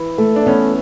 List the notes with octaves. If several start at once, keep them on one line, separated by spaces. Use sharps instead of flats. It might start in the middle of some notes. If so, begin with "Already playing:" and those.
Already playing: E3
A3
D4
E3 B3 C#4